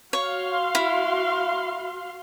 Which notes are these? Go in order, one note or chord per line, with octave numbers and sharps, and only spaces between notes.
F#4 C#5 F5 C6
E4